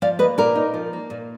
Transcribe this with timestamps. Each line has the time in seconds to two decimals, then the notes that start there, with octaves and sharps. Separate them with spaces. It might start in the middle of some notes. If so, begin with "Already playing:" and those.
0.02 F3 D5 F5
0.19 A#3 B4 D#5
0.38 A#2 A#4 D5
0.55 D#4
0.74 F3
0.93 A#3
1.10 A#2